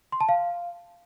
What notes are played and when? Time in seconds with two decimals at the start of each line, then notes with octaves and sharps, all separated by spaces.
0.12 C6
0.21 A5
0.29 F5